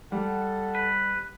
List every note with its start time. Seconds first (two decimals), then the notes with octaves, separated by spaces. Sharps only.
0.12 G3 A4 F#5
0.75 B4